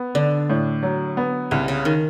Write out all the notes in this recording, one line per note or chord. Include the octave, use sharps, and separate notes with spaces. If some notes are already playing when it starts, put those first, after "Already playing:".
Already playing: B3
D3 D4
A2
F#3
B3
C2 C#3
C#3
D#3